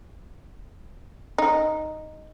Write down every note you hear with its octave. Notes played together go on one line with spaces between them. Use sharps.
D#4